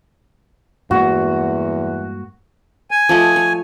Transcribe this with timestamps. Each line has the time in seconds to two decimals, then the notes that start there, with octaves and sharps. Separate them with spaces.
0.91 E2 G2 G#3 A#3 F#4
2.91 G#5
3.09 F3 A3 D#5
3.36 C#5